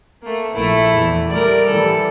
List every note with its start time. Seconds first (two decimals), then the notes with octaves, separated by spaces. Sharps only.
0.23 A3 A#3
0.53 A#1 A3 E4
0.93 E2
1.30 G3 A3 A#4 D5
1.68 A2 E3 G3 A4